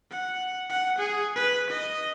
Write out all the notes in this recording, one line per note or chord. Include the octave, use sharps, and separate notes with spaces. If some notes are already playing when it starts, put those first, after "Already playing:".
F#5
F#5
G#4
B4
D#5